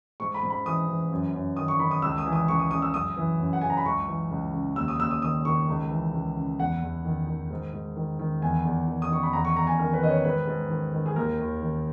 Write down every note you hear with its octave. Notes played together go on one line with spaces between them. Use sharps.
G#2 C#6
B5
G#2
B5
E3 D#6
E3
F#2
F#2
D#3 D#6
C#6
D#3 B5
D#6
C#2 E6
D#6
E3
D#6
C#2 C#6
D#6
C#3 D#6
E6
F#2 D#6
E3
F#2
F#5
C#3 G#5
A#5
B5
C#2 C#6
E3
C#2
C#3
D#2 E6
D#6
D#2 E6
D#6
D#3 D#6
D#3 C#6
C#2
E3
C#2
C#3
E2 F#5
E2
D#3
D#3
G#2
G#2
D#3
D#3
E2 G#5
E2
D#3
D#6
D#3 C#6
B5
E2 A#5
C#6
E2 A#5
G#5
D#3 A#4
B4
D#3 D#5
C#5
G#2 B4
G#2
D#3
D#3
G#4
D#2 A#4
D#2
D#3